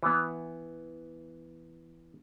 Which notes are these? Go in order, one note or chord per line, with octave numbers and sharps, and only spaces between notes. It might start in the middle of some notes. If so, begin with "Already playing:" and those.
E3 B3